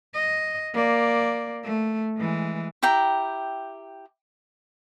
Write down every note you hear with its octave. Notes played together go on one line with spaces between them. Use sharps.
D#5
A#3 D5
A3
E3 G#3
E4 G4 G5 A#5